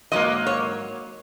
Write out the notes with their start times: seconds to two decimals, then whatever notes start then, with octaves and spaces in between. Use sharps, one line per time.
0.12 G#2 F#3 A#3 D#5
0.46 C#5